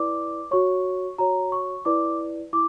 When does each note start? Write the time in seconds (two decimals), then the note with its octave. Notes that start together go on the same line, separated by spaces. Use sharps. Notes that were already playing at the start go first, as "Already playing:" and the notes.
Already playing: E4 B4 D5 D6
0.51 F#4 C#5 C#6
1.18 F#4 C#5 A#5
1.52 C#6
1.85 E4 B4 D5 D6
2.53 E4 D6